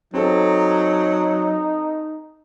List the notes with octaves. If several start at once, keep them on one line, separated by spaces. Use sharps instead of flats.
F#3 C4 D#4 A4